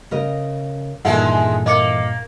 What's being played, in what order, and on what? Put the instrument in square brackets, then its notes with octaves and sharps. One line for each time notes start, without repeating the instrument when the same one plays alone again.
[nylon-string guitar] C#3 A#4 D#5
[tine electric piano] G2 A#2 [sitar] D#3 G#3 E4 [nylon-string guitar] E3 A4 [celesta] F#5
[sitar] A#3 [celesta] D#5 D6 C#7